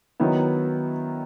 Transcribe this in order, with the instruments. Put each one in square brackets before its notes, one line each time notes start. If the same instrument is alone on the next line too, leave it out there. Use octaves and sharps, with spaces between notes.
[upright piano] D#3 F#3 B3 E4